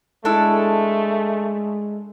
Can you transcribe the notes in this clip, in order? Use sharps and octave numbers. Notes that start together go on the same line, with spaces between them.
G#3 A3 D4 E4 A4